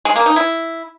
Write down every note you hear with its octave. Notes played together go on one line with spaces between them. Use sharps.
G#3
A#3
D#4
E4